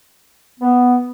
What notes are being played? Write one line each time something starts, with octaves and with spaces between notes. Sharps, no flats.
B3